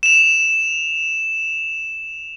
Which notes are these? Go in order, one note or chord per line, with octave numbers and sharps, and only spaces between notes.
E7 F7